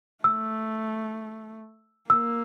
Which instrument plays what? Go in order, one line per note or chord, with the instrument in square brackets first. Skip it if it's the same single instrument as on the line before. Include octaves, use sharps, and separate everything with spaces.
[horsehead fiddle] A3 [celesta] E6
[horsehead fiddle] A#3 [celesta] E6